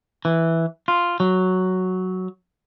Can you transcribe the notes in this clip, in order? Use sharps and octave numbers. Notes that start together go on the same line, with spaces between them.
E3
F4
F#3